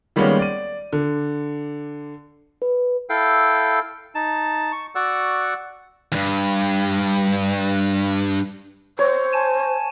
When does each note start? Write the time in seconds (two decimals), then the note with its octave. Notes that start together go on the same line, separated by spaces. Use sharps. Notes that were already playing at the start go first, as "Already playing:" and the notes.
0.16 D#3 G3 G#3 A#3 B3 C#4
0.39 D5 D#7
0.93 D3
2.62 B4
3.10 E4 A4 F5 G5
4.15 D#4 A5
4.72 C#6
4.95 F#4 D5 F#5 C#6 E6
6.12 E2 G2
8.99 C5 C#5
9.33 G#5 A5